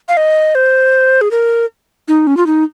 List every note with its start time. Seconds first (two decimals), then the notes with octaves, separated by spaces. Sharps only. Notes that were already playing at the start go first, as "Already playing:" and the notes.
0.08 F5
0.17 D#5
0.55 C5
1.21 G#4
1.31 A#4
2.08 D#4
2.27 C#4
2.37 F4
2.46 D#4